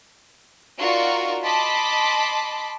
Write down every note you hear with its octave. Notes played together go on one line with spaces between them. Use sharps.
D#4 F4 F#4 A#4 D5 C#6
D#5 A5 B5 C6 D6 B6